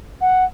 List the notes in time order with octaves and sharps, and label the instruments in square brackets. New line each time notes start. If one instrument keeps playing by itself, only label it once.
[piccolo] F#5